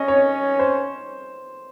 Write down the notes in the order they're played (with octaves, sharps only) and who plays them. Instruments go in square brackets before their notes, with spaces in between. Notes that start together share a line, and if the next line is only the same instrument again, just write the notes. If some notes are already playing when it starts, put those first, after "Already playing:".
Already playing: [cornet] C#4 [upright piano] D#5
[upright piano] C#5
C5